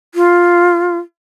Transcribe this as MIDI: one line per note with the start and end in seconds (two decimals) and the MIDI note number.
0.15 0.97 65